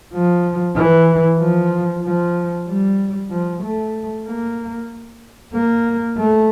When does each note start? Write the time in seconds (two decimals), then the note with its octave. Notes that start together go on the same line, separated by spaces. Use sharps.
0.13 F3
0.76 E3
1.39 F3
2.03 F3
2.68 G3
3.31 F3
3.63 A3
4.26 A#3
5.54 A#3
6.18 A3